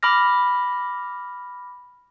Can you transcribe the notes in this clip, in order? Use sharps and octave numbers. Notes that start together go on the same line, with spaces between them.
B5 D6 F6 A#6